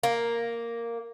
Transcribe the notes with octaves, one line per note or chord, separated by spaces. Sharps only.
A#3